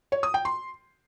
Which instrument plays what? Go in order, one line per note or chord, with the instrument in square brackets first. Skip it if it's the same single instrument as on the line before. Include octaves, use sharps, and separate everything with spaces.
[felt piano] C#5
D#6
G5
C6